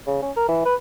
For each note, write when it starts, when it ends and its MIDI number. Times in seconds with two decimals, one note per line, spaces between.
0.07 0.18 49
0.22 0.31 61
0.37 0.45 70
0.49 0.62 52
0.65 0.75 71